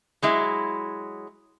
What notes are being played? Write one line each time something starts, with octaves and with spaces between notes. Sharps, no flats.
F#3 G#3 E4